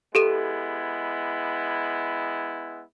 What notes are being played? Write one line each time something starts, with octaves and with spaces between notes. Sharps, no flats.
G#3 B3 E4 G4 A4 D#7